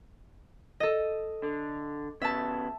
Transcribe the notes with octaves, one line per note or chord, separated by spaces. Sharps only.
A4 D#5
D3
C#3 B3 E5 A5